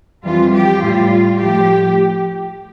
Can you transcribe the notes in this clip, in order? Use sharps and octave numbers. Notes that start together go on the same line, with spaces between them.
F2 E3 G3 F4
G4
A2 G3 F4
A2 F3 A3 G4